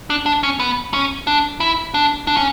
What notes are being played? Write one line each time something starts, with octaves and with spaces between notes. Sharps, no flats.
D4
D4
C#4
B3
C#4
D4
E4
D4
D4
C#4